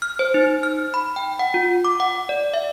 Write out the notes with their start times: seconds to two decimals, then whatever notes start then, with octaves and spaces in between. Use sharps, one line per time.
0.02 F6
0.19 C5
0.34 D#4
0.63 F6
0.94 B5
1.16 G5
1.39 F#5
1.54 F4
1.85 D6
2.00 F#5
2.29 D5
2.54 E5